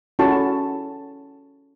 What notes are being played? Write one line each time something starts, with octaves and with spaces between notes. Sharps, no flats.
C#4 E4 F#4 A4 A5 C#6